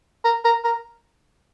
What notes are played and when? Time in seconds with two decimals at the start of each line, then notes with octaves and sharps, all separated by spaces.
0.25 A#4
0.44 A#4
0.64 A#4